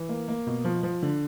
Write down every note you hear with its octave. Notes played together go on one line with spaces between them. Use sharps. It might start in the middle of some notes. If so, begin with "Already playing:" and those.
Already playing: E3
A#3
A#3
B2
F3
F3
D3